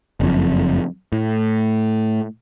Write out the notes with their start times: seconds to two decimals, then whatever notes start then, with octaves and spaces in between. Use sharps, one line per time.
0.20 F#1 F2
1.12 A2